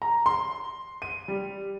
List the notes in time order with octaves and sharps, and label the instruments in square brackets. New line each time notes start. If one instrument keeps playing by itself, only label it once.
[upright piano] A#5
C6
D#7
G3